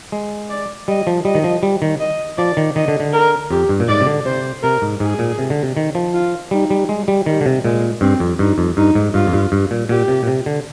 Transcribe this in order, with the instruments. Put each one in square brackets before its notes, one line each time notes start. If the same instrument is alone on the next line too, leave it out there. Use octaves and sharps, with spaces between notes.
[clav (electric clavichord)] G#3
[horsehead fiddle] D5
[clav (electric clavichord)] G3 [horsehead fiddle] D#5
[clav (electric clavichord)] F3
[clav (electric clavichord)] G3 [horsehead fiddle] D#5
[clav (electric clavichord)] D#3
F3
G3
D#3
[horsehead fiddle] D#5
[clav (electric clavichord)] F3 [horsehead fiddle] D5
[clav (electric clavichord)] D#3
[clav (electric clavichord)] D#3 [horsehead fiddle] D#5
[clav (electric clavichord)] D3
D3
[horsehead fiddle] A#4
[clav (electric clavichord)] F2 [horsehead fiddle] G4
[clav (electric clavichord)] G2
A#2
[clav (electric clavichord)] G#2 [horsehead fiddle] D5
[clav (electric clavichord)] C3
D3
[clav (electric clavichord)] C3 [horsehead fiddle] C5
[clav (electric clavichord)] C3 [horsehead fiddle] A#4
[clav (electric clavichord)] G#2
[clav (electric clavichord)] G#2 [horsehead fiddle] G#4
[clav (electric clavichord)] A#2
C3
D3
C3
D#3
F3
[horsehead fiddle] F4
[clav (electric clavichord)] G3 [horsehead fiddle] D#4
[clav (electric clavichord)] G3
G#3
G3
[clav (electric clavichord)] D#3 [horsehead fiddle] G3
[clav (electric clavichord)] D3
C3
[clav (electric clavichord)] A#2 [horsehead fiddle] G#3
[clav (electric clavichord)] G2 [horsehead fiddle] C4
[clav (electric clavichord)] F2
[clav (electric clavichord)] G2 [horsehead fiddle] D#4
[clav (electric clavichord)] F2
[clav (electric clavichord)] G2 [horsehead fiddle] D#4
[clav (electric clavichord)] G#2
[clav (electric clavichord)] G2 [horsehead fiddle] F4
[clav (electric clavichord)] F2
G2
G2
A#2
[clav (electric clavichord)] A#2 [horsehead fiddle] G4
[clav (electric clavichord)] C3
A#2
C3
D3